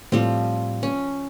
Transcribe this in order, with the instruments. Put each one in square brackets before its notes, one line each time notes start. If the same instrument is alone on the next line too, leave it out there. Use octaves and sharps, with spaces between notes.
[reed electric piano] A2 [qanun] F3 G3 C4
[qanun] C#4